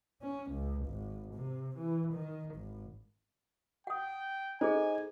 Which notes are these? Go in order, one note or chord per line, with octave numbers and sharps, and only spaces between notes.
C#4
C#2
G#1
C3
E3
D#3
G#1
F#5 G5 D#6
D#4 G#4 A4 C5 G#5